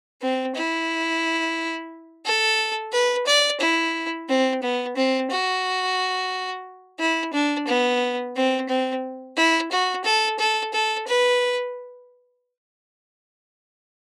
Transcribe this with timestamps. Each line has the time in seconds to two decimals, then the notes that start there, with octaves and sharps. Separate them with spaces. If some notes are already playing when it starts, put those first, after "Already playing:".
0.21 C4
0.54 E4
2.25 A4
2.92 B4
3.26 D5
3.60 E4
4.29 C4
4.62 B3
4.96 C4
5.30 F#4
6.99 E4
7.33 D4
7.67 B3
8.35 C4
8.69 C4
9.36 E4
9.71 F#4
10.04 A4
10.39 A4
10.73 A4
11.07 B4